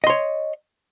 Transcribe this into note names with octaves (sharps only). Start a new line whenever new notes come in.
C#5 D#5 C6